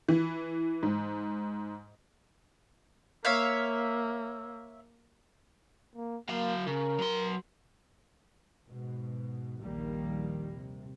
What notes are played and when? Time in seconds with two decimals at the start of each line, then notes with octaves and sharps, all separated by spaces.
0.09 E3
0.83 G#2
3.25 A#3 C#5 E5 F5
5.96 A#3
6.29 F#3 A#3 F5
6.67 C#3 A#4
6.98 F#3 C6
8.67 G#2 B2
9.62 A#1 D#2 D#3 G3 A#3
10.54 C3